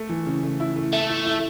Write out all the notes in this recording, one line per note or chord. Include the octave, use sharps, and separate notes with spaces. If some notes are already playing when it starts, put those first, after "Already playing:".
Already playing: A3
E3
C#3
A3
E4
A3
A3 A4
E4
E4